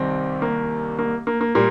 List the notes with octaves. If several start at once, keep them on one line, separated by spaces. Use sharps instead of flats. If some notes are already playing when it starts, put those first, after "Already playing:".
Already playing: C2 C3 D#3 G3 C4
A#3
A#3
A#3
A#3
A#2 G3 A#3